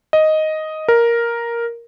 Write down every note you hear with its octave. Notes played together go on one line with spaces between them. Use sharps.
D#5
A#4